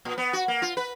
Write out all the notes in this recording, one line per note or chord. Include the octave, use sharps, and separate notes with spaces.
A#2
B3
F#4
A#3
F4
B4